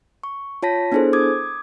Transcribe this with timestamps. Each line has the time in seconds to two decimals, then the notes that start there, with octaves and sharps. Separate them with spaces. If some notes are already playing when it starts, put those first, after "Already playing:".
0.23 C#6
0.63 F4 C#5 A5 A#6 B6
0.92 B3 D4 E4 G#4 A4 C5
1.13 D6 D#6 G#6